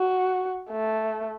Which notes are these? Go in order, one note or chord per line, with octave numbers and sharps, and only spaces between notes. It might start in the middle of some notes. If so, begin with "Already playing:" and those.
Already playing: F#4
A3